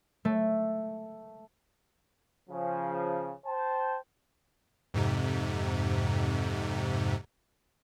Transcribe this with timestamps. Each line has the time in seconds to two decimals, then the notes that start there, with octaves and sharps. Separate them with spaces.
0.25 A3
2.50 C#3 F3
3.46 C5 G5 A5
4.94 F2 G#2 C3